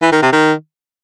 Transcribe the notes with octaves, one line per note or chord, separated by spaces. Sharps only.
E3
D#3
C3
D#3